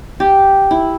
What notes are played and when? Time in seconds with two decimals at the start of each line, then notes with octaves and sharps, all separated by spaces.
0.20 G4
0.71 E4